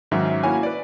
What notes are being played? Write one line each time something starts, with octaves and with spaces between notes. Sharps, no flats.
G#2 D#3 F#3 C#4 E5
A#3 E4 F#4 C#5 G#5
B4 D5